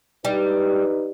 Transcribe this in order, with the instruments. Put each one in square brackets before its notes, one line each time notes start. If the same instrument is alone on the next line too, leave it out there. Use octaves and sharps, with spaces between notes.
[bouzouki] G3 [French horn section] D#4 B4